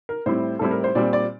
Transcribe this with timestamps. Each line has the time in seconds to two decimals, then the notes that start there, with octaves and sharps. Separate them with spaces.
0.09 A#4
0.26 A2 G3 C4 E4 C5
0.59 A2 G3 C4 E4 A4
0.71 A#4
0.84 C5
0.95 A#2 G3 C4 D5
1.13 D5